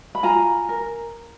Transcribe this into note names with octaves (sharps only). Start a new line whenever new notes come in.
B5
F4 G#5 A#5
A#4